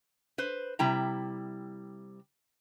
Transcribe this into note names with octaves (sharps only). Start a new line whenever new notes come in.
B4 C5
C3 G3 E4 G5 A#5